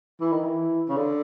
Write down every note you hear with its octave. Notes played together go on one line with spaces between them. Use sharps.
E3
D#3
E3
C#3
D3